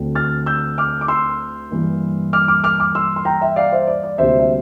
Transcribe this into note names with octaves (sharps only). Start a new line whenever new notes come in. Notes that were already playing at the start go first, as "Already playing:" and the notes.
Already playing: D2 D3 A3 C4
F6 A6
E6 G6
D6 F6
D6
C6 E6
G2 E3 A#3
D6 F6
D6 F6
D6 F6
D6 F6
C6 E6
C6
G5 A#5
E5 G5
D5 F5
C5 E5
D5
D5
D2 C3 G3 A#3 C5 E5
E5